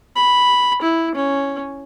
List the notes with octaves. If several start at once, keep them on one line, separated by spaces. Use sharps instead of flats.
B5
E4
C#4